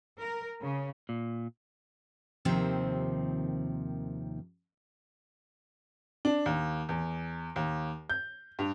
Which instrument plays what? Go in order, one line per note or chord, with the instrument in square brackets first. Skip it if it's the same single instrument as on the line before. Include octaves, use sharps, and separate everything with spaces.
[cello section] A#4
C#3
[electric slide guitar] A#2
[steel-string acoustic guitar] D#2 C3 D#3 F3 C4
[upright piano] D4
D#2
E2
D#2
G6
G2